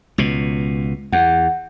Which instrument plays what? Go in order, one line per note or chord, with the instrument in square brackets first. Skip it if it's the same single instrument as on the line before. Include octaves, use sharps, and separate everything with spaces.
[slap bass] C#2 B2
[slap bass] E2 [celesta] F#5